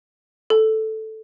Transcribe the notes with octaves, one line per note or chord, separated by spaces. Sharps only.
A4